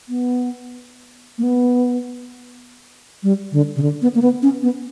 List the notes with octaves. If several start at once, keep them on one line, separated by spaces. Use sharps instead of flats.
B3
A#3
B3
G3
D3
C#3
D3
B3
A#3
B3
C#4
B3